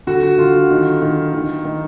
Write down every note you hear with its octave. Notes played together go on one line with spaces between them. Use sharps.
D3 F#4
D3 F4
D#3
D#3
D#3
D#3